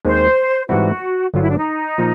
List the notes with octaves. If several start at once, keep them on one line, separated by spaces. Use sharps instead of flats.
D#2 D#3 G#3 C4 C5
G#2 E3 G3 C4 E4 F#4
G1 G2 D3 F#3 F4
E4
D4
D#4
A#2 F3